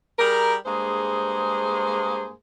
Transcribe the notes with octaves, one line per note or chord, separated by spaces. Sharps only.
G3 G#4 A#4
G2 G#3 A#3 G#4 C5